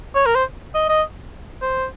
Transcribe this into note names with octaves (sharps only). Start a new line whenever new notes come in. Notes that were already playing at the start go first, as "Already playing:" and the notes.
C#5
A#4
C5
D#5
D#5
C5